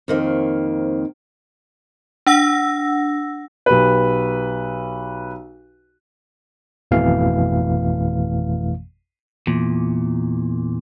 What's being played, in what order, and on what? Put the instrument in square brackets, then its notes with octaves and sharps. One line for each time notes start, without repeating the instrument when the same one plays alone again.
[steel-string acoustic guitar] F2 D#3 A#3 C4
[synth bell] D4 F#5 E6 A#6
[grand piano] B1 G4 B4
[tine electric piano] G#1 F2 B2 E3 A3 F5
[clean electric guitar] E2 A#2